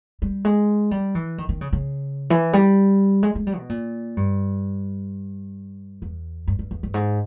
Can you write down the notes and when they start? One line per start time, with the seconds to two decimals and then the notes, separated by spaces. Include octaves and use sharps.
0.22 G3
0.45 G#3
0.91 G3
1.15 E3
1.38 D#3
1.49 D#3
1.61 C#3
1.73 C#3
2.30 E3
2.53 G3
3.23 G#3
3.35 G#3
3.47 G3
3.58 B2
3.69 A#2
4.17 G2
6.02 E2
6.48 G2
6.59 G2
6.71 E2
6.83 G2
6.94 G#2